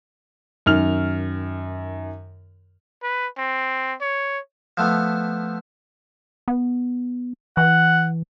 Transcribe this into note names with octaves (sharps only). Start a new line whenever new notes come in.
F#2 D#3 F6 F7
B4
C4
C#5
F3 A3 B3
B3
E3 F#5